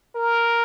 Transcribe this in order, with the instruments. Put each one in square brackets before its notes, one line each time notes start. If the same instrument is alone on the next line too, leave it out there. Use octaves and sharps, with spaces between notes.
[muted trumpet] A#4